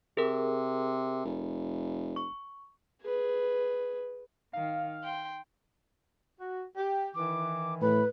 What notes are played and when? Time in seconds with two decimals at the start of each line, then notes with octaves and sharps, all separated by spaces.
0.17 C3 G#4 A#4
1.25 F1
2.16 C#6
3.02 G#4 B4
4.53 D#3 F5
5.04 G5 C6
6.39 F#4
6.76 G4
7.15 D#3 E3 D6
7.81 A2 B4 B5